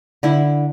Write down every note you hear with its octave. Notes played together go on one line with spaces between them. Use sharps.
D3 E4